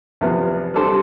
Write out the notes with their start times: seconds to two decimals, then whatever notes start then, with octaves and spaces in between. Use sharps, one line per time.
0.21 E2 C3 F3 B3
0.74 G3 D4 A4 C5